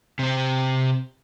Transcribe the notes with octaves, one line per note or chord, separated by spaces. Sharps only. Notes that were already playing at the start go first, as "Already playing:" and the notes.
C3 C4